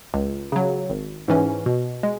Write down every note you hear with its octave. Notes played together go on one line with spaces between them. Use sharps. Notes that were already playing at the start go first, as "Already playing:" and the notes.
C#2
C#3 F#3
G#1
G#2 E3 C#4
B2
G#3